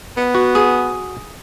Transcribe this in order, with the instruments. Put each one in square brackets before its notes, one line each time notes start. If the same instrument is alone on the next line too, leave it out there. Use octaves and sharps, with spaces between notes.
[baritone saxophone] B3
[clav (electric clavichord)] F#4
[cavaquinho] G#4